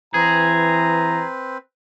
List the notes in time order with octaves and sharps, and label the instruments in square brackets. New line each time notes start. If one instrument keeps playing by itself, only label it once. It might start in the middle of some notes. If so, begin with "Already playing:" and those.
[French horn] E3 [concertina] C4 B4 [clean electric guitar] G#4 [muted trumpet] A#5